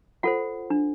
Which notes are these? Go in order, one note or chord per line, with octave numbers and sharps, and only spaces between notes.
F4 A4 C5 F#5
D4